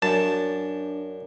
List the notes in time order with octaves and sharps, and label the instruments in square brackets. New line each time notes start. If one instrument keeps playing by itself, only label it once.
[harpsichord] F#2 [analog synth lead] D4 [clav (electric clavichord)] A5